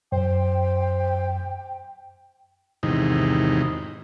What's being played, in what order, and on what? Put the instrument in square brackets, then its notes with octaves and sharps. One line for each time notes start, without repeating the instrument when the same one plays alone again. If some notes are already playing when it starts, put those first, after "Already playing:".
[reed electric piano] F#2 [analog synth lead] C5 [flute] G5
[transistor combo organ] E2 G#2 C3 D#3 D#4